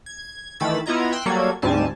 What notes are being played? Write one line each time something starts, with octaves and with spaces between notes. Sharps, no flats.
G#6
D#3 E3 A3 B5 E6 A6
B3 E4 F4 D#5 A#5 G#6
G5 C6 E6 F#6
F#3 G3 A#3 F#4 A4 G#6
D2 G#2 G3 C4 G#5 A5